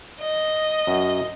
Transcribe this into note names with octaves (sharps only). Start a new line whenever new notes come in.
D#5
F#2